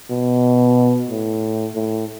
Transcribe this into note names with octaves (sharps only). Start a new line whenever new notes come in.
B2
A2
A2